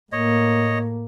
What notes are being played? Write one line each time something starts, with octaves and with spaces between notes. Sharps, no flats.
A2 A#3 C#5 D#5